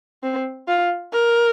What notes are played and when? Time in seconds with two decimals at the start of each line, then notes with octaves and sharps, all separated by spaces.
0.23 C4
0.68 F4
1.13 A#4